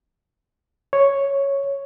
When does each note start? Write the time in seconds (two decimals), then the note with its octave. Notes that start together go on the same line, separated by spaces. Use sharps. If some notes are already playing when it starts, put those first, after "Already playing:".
0.93 C#5